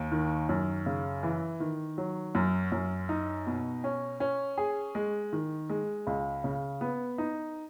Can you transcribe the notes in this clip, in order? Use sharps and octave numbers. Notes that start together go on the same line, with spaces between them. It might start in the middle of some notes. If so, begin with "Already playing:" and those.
Already playing: D#2
D#3
F#2
C#3
E3
D#3
F#3
F#2
F#2
D#4
B2
C#4
C#4
G#4
G#3
D#3
G#3
C#2
C#3
B3
D#4